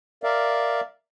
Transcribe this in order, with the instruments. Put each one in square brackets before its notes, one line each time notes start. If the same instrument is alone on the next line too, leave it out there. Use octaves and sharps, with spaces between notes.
[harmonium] A#4 D5 E5 F5